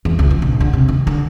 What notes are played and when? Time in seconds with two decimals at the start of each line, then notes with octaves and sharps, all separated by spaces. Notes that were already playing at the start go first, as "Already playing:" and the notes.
0.05 E2
0.19 C#2
0.31 E3
0.42 A#1
0.60 D3
0.73 C3
0.88 D#3
1.07 D3